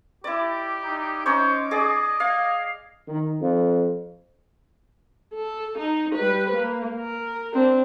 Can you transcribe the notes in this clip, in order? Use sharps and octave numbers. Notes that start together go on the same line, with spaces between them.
E4 G4 D5
D#4
C#4 D#4 C5 C#5 D6
G#4 D5 D#5
F5 G#6
D#3
F2
A4
D#4
G3 B4
A#3
A#4
C4 D4